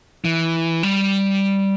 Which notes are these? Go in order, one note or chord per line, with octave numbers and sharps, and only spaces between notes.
E3
G3